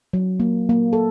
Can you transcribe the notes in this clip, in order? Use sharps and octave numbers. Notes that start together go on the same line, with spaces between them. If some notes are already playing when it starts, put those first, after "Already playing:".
F#3
A#3
A#3
A4